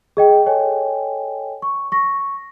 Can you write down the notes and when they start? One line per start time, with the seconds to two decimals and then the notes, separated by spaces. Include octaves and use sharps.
0.17 G#4 D#5 G5
0.46 A4 C#5 D#5 G5 G#5
1.62 C#6
1.92 C#6 A#6